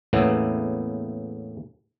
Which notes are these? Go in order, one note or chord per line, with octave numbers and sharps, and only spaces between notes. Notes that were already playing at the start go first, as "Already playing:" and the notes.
E2 A2 C#3 A#3 B3 E4